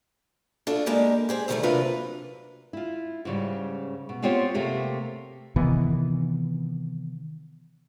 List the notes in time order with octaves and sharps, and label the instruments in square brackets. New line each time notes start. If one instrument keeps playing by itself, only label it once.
[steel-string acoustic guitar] D4 F4 F#4 A4
B2 G#3 A#3 G4 A#4 D5
G4 G#4 C5
F2 D3 D#3 F3 G3 A3
C3 F#3 A#3 D4 F4 B4
[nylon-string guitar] E4 F4
G#2 C#3 G3
B2
B3 C4 F4 G4 C5 C#5
C3 A3 A#3 G4
[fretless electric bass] C3 D#3 E3 B3